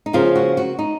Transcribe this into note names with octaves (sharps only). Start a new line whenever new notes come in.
D#4
C#3 F3 A#3 F4
F#4
F#4
D#4